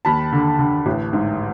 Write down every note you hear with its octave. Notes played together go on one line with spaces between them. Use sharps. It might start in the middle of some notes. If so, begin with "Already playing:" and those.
D#2 A5 B5
D3
D3
A1
G#2